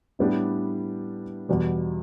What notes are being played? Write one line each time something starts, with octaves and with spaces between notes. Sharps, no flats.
A2 G3 B3 D4 G4
E2 B2 G3